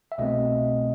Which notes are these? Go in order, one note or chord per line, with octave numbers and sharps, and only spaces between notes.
E5
C2 B2 A3 C4 D#5